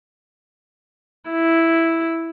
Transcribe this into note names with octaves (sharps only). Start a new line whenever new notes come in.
E4